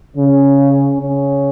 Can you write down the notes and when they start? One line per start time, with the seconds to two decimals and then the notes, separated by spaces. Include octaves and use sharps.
0.16 C#3 C#4
1.00 C#3 C#4